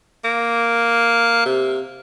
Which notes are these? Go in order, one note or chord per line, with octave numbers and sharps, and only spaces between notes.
A#3
C3